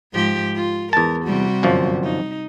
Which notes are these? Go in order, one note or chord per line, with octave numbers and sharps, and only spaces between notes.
G#2 F3 G4
F4
E2 A#4 A5
C3 G3 F#4
G1 F#2 F3
D#4